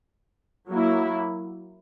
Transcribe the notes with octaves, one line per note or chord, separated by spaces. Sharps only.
F#3 A#3 E4